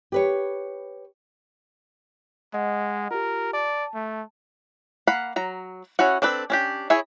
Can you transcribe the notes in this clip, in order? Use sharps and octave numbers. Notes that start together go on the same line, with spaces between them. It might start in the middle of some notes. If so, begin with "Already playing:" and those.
G4 B4 C#5
G#3 D#5 F#5
F4 G4 A#4
D5 A5
A3
A#3 F5 F#5 B5
F#3 A#5
C#4 E4 F#4 F#5
C4 D4 A4 B4
C#4 D4 G4
E4 G#4 C#5 E5 G#5